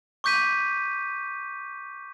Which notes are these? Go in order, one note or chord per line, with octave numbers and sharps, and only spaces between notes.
C#6 D6 G6 B6 D#7